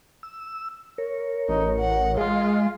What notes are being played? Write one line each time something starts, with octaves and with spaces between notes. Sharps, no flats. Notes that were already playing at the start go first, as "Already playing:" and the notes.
E6
A#4 C#5
A1 D#4
F#5
G#3 F4